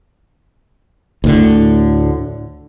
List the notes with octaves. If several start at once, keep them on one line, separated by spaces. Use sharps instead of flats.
D2 A2 D3